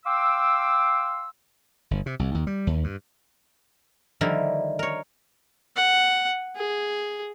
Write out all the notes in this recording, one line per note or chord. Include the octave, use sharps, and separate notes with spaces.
F5 G5 C6 D6 E6
G1
C3
C2
D#2
G3
D#2
G2
D3 D#3 F3 G3 E4 A#4
A#4 C#5
F#5
G#4